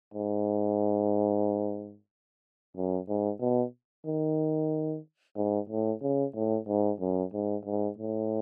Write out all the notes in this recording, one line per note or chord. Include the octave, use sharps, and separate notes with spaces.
G#2
F#2
G#2
B2
D#3
G#2
A2
C#3
A2
G#2
F#2
G#2
G#2
A2